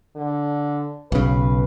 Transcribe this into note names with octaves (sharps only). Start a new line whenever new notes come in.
D3
B1 C#3 B4